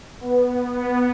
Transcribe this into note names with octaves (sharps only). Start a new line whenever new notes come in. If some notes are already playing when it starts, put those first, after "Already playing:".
B3
B3